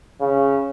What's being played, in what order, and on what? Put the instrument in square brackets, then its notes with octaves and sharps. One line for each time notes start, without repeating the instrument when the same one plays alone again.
[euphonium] C#3